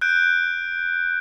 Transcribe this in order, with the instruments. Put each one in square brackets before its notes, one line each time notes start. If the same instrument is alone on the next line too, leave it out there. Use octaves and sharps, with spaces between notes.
[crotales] F#6 G6 D7